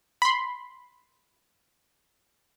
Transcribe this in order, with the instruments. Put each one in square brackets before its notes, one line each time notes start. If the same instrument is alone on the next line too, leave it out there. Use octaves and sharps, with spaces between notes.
[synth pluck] B5 C6